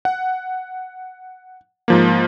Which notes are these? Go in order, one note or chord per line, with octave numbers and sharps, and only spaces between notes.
F#5
G#2 F3 A#3